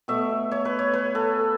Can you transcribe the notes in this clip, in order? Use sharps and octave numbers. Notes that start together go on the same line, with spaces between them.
B2 A3 E5
C#5
B4
C#5
B4
A4